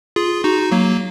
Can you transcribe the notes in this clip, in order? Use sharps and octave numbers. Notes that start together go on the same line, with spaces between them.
F4 G#4
D#4 F#4
F#3 A#3